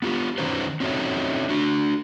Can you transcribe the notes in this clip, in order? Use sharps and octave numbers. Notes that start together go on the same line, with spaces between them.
B3 F4 G4
D#3 C#4 D#4 F4 B4 C5
C4 C#4 D#4 F#4 A4 E5
D4 F#4